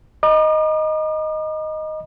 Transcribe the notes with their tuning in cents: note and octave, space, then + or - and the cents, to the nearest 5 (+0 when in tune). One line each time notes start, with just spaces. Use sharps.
D#5 +0 A#5 +45 D6 +45